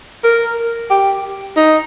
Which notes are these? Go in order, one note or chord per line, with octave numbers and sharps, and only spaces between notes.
A#4
G4
D#4